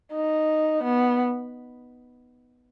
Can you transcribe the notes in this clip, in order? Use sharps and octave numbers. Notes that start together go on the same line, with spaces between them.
D#4
B3